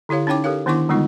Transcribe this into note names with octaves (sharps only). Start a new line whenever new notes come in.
D3 E4 G4 C#5 F5
C#4 D#4 C#5 G5 D6
G4 A4 A#4 C#5 F5
D#3 B3 D4 E4 C#6 D6
D3 G3 G#3 B3 D#4 F4